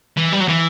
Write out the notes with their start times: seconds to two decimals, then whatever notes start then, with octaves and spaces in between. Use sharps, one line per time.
0.17 E3
0.33 G3
0.41 F#3
0.48 E3